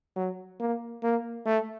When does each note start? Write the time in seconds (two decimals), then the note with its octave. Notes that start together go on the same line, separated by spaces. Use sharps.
0.16 F#3
0.60 A#3
1.03 A#3
1.46 A3